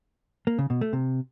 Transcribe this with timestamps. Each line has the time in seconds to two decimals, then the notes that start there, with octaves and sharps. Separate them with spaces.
0.47 A#3
0.58 C#3
0.70 B2
0.81 A3
0.93 C3